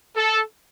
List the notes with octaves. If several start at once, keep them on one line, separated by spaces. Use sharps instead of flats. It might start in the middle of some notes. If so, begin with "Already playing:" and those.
A4